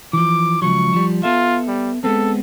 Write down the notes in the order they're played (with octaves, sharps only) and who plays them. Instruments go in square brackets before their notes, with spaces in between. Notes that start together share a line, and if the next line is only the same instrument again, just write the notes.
[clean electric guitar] E3 F3 [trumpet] D6
[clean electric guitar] C#2 F3 F#3 [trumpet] C#6
[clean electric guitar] F3 G3
[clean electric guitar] B3 A4 E5 [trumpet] F4
[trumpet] G3
[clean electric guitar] G#3 B3 C4 [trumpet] A4